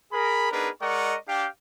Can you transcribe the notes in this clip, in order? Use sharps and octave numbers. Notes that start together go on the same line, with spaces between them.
G#4 A#4 B5
B3 D4 D#4 G#4 A#4 B4
G#3 A#4 D5 D#5 F#5 C#6
D4 G4 F5 G5